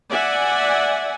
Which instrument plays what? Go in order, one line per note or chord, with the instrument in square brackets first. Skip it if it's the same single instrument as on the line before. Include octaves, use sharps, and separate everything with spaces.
[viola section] D5 E5 F#5 G#5